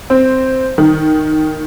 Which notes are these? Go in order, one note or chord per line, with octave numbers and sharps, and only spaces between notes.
C4
D#3